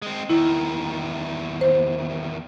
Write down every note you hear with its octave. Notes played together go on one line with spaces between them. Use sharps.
G#3 C4
E2 D#3 E4
C5